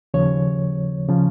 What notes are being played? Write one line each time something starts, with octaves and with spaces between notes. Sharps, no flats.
D#2 C#3 F3 C#5
C#3 F3